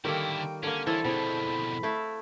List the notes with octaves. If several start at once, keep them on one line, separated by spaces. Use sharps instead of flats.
D3 D#3 G3 A#3 E4 A4 G5
D3 A#3 C#4 D5
E3 E4 A4 C5 C#5
B2 F3 C4 E4 G#4 B5
A3 E4 F5